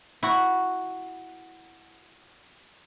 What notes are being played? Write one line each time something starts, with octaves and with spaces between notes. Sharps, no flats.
E4 F#4